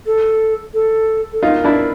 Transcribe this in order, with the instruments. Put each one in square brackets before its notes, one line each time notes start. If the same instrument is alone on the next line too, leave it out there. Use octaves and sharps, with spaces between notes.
[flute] A4
A4
A4
[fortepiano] D#4 F4 [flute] A#4
[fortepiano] D4 E4